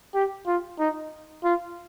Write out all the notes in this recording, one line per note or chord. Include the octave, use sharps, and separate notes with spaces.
G4
F4
D#4
F4